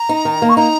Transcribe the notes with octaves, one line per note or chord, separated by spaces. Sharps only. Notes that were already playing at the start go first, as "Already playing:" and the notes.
Already playing: A#5
D#4
D#3
A#3
C#6
D#4 A#5